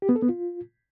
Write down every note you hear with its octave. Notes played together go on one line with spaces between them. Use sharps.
G4
B3
A4
B3
F4